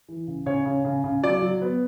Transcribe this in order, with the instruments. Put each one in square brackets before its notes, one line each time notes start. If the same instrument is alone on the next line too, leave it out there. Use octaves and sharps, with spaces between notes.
[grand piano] E3
C#3
C#3 C#5
C#3
C#3
C#3
F#3 D5
F#3
B3